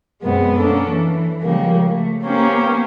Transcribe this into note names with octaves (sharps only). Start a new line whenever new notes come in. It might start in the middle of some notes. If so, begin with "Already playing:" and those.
F#2 B2 G#3 B3 C4
A#3 C#4 D4 A4
E3
C#3 F3 G3 G#3 A#3
A3
A#3 B3 C#4 G4 C5